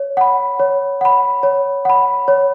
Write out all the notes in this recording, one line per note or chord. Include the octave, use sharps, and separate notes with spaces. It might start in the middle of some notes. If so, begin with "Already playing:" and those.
Already playing: C#5
F#5 B5
C#5
F#5 B5
C#5
F#5 B5
C#5